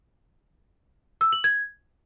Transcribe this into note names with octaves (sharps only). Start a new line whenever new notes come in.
E6
F#7
G#6